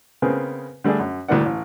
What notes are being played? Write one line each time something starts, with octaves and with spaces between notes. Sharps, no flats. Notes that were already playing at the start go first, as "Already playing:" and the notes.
C#3 B3 C4 G#4 A#4
D3 G3 A3 D4 G#4
F#2
D2 A2 G3 A#3 D4 F#5
A1